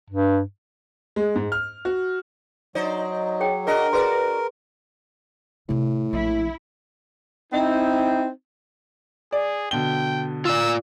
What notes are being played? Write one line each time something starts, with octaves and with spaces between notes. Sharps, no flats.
G2
G#3
G#2
F6
F#4
F#3 D#4 C5 D5
G#4 C#5 G5
D4 F#4 G#4 A#4 D#5
F#4 G#4 B4 D5 C6
A2 C3 F4
A#1 F3 E4
C4 D#4 E4
G#4 D5
B2 D3 G5 G7
F4 D5 E6